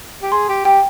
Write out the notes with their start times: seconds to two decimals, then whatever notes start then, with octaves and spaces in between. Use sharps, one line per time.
0.22 G4
0.32 G#4 C6
0.49 G4
0.65 G4 G5